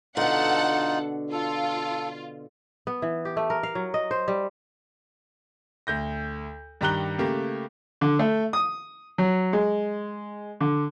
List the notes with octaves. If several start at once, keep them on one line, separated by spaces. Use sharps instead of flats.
B2 D3 D#4 F4 A4 F#5
F4 A4
B3
E3
G4
A3
A#4
F5
F#3
D#5
C5
G3
D2 G6 A#6
G2 D#3 G4 A#5 F#6 G7
C#3 A3 A#3 G4
D3
A3
D#6
F#3
G#3
D3